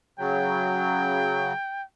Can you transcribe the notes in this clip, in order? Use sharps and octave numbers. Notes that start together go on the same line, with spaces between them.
C#3 F#3 G5